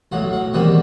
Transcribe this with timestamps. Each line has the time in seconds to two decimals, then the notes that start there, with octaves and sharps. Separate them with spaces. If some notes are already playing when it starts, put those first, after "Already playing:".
0.12 B1 A2 F#3 F#5
0.33 F#5
0.53 E2 C3 D#3 G3 A#3 F#5